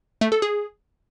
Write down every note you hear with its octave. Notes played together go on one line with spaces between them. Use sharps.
A3
A4
G#4